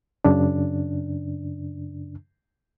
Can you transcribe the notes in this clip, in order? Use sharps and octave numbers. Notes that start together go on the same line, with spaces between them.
F#2 C#3 D4